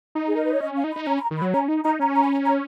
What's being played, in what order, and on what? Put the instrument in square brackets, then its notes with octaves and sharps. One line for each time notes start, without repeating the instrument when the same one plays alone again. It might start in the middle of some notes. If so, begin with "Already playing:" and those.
[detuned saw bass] D#4
[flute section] G#4
A#4
B4
C#5
[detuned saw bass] C#4 [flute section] D#5
[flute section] F5
[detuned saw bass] D#4
[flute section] B5
[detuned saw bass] D#4
[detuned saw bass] C#4 [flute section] A#5
[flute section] B5
A#5
[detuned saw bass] D#3
[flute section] B5
[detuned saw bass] F#3
[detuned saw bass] C#4 [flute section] A#5
[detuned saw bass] D#4
[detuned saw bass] D#4 [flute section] A#5
[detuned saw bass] C#4 [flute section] A#5
[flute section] A#5
B5
A#5
A#5